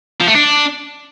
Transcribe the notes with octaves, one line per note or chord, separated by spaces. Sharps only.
F3
A3
D4